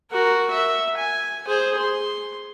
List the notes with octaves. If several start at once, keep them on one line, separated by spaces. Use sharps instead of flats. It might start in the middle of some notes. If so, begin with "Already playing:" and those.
F#4 A#4
E5
G#5
G#4 C5
C6